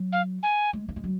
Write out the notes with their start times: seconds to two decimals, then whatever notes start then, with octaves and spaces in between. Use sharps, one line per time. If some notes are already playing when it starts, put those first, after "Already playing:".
Already playing: F#3
0.12 F5
0.43 G#5
0.73 G#3
0.89 A#3
0.96 G#3
1.04 F#3